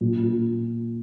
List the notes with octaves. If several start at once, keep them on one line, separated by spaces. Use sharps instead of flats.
A#2
A#2